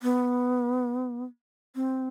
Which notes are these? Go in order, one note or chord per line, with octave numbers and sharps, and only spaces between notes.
B3
C4